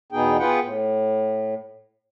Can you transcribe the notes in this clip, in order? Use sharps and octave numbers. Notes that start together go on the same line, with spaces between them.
E2 B2 B3 D#4 G#4 G5
B3 F4 G#4 B4 F#5 G5
A2